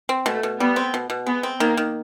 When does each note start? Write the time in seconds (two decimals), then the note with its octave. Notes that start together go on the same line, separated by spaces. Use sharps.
0.09 C4
0.26 B2 A3
0.43 B2
0.60 G3 B3
0.76 C4
0.94 B2
1.10 B2
1.26 G#3 B3
1.43 C4
1.60 D#3 A#3
1.77 D#3